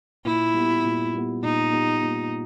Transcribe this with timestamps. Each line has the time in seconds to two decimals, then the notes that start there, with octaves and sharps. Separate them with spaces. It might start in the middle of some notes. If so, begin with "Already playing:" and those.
0.25 A#2 E4
0.54 G3 B3
0.85 A#2
1.14 G3 B3
1.43 A#2 D#4
1.73 G3 B3
2.03 A#2